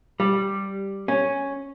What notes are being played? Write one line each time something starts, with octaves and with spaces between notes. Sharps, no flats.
G3
C#4